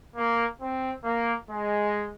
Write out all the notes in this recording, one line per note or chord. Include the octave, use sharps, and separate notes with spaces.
A#3
C4
A#3
G#3